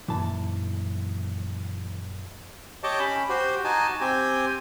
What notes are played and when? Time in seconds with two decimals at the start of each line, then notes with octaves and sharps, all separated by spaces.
0.08 F#2 A#2 D#3 E3 A5
2.84 G4 C#5 D#5 A5 D6
3.00 C#4 B5
3.29 F#4 G4 C5
3.65 D#4 F#4 G#5 A5
4.01 C4 G4 G#5